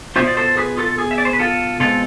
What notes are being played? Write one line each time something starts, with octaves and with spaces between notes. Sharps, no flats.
B2 B3 F4 C5 E5
D5
A4 C5
G#4 B4
F4 A4
G#4
E5
D5
C5
B4
F4 A4
B2 G#3 C4 F4 A4